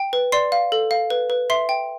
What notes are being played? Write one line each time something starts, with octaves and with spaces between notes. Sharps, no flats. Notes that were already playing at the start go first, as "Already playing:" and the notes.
Already playing: G5
B4
D5 C6 C7
F5
A4
F5
B4
B4
E5 C6 C7
G5